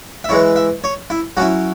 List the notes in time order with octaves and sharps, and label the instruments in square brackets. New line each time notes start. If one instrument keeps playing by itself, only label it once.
[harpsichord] E5
E3 G#3 E4 C#5
E5
C#5
E4
F#3 C#4 E4 F#4